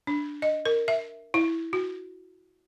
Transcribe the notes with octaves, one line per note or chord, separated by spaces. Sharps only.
D4
D#5
A#4
E5
E4
F#4